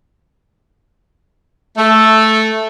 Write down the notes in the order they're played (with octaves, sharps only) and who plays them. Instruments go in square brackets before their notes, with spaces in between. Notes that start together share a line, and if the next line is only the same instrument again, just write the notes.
[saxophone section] A3